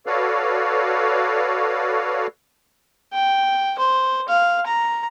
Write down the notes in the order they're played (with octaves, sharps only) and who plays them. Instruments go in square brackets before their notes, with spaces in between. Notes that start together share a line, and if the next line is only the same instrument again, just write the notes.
[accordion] F#4 A4 B4 C#5 D5 F5
[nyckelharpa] G5
C5
F5
A#5